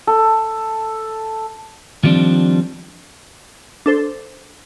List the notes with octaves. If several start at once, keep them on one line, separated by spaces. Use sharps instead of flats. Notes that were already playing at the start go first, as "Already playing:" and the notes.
A4
D#3 F3 G3 C4 D4
D4 A4 C5